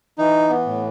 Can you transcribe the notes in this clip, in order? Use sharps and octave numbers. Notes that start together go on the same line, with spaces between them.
E3 D#4
B3
A2